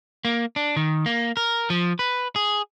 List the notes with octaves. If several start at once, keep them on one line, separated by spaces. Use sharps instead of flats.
A#3
D4
D#3
A#3
A#4
F3
B4
G#4